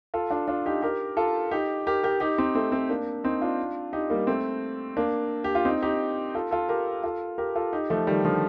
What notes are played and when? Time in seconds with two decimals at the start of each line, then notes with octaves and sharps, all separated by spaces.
0.14 F4 A4
0.31 D4 F4
0.48 D4 F4
0.66 D#4 G4
0.82 G4 A#4
1.17 F4 A4
1.51 D#4 G4
1.87 G4 A#4
2.03 G4 A#4
2.20 D#4 G4
2.38 C4 D#4
2.55 A3 C4
2.72 A3 C4
2.89 A#3 D4
3.24 C4 D#4
3.41 D4 F4
3.93 D#4 G4
4.10 G3 A#3
4.27 A3 C4
4.97 A#3 D4
5.44 G4
5.55 F4
5.65 C4 D#4
5.82 D#4 G4
6.35 F4 A4
6.51 F4 A4
6.69 G4 A#4
7.04 F4 A4
7.38 G4 A#4
7.56 F4 A4
7.73 D#4 G4
7.90 F3 A3
8.07 D#3 G3
8.24 D3 F3